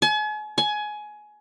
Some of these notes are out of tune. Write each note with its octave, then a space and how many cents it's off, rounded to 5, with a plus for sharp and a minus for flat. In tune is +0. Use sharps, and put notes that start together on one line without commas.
G#5 +40
G#5 +20